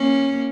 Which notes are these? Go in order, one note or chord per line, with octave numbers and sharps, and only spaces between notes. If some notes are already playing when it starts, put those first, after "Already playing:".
Already playing: A#3 C#4